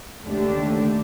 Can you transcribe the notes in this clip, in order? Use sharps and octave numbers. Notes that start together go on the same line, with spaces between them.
D#2 D3 A3 D4 G4